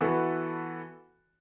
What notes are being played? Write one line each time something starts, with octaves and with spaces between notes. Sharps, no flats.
E3 B3 F#4 A4